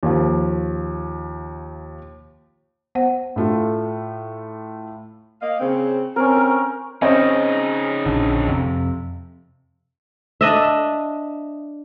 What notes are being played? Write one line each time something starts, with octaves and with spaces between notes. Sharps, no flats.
D#2 F3
B3 C5 F#5
A2 A3 F4
A#3 D#5 F5
C#3 C4
C4 C#4 A#4
A#4
C#3 C4 C#4 D#4 D#5
A#1 D3
F2 C3
D4 D#5 E5